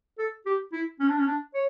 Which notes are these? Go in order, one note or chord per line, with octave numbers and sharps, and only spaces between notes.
A4
G4
E4
C#4
D4
C#4
D4
C#5